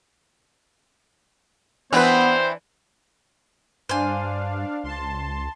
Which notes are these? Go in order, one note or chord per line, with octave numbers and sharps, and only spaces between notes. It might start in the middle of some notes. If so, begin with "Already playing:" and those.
E3 B3 C4 D4 B4 C5
G2 D4 C5 F5 G#5
C#2 A5 C6